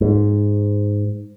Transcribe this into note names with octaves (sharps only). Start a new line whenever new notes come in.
G#2